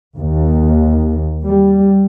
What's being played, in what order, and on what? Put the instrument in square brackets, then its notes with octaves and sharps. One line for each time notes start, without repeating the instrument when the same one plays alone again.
[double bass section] D#2
G3